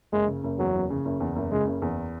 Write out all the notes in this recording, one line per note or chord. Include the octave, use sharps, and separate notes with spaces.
F#1 G#3
C#3
F#1
E2 F#3
F#1
C#3
F#1
E2
F#1
C#3 G#3
F#1
E2